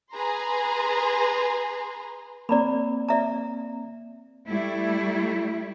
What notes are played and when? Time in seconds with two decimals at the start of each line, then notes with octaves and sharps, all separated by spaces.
0.13 G#4 B4 A#5 C6
2.49 A#3 C4 D5 A#5 B5
3.08 D5 E5 A#5
4.47 G3 A3 E4